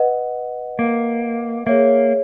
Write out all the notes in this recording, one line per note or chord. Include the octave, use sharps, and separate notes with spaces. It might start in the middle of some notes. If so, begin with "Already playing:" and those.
Already playing: B4 D#5 F#5
A#3
A#3 G#4 C#5 E5